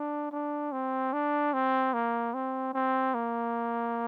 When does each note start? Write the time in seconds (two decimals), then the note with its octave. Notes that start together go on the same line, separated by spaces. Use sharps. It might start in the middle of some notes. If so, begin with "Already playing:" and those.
Already playing: D4
0.32 D4
0.72 C4
1.13 D4
1.53 C4
1.94 A#3
2.34 C4
2.74 C4
3.14 A#3